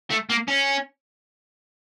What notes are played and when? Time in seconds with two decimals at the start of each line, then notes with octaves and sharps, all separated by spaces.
0.11 A3
0.30 A#3
0.48 C#4